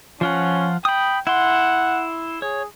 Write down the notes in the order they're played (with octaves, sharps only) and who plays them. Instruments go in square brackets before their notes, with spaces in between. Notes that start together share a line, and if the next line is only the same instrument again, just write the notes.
[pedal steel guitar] F3 F4 F#5 [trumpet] C#4
[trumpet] G5 [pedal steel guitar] B5 D#6
[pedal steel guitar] E4 C6 [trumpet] F#5
[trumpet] G#4 [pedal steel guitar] C#5